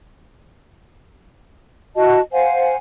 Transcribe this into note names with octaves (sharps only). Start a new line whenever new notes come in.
E4 F#4 D#5 A5
C5 F5 F#5 G#5